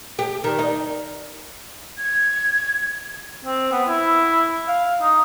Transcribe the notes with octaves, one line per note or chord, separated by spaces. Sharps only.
G4
D#3
D#4
G#6
C4
B3
E4
F5
D#4